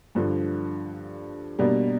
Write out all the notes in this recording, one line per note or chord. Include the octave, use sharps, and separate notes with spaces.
G2 D3 F3
B2 G3 A#3 D4